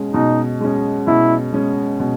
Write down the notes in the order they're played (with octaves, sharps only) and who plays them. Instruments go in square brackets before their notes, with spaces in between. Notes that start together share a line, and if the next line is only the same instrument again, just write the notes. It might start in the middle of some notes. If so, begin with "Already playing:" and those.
Already playing: [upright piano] B2 G#3 C#4
[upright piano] B2 [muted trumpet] D#4
[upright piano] G#3 C#4
[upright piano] B2 [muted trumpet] E4
[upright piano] G#3 C#4
B2